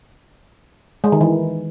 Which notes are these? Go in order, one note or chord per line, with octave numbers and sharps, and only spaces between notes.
G#3
D#3
E3